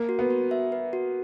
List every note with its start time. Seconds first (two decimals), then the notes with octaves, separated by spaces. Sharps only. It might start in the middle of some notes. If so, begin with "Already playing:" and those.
Already playing: A#3
0.09 F#4
0.19 B3
0.30 F#4
0.51 E5
0.72 B4
0.93 F#4